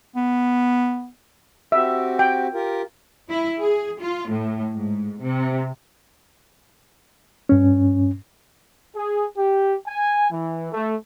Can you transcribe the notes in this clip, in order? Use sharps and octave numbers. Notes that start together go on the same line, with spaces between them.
B3
C4 F#4 G4 E5
G5
F4 G4 A#4
E4
G#4
F4
A2
G#2
C3
G2 C#4
G#4
G4
G#5
E3
A3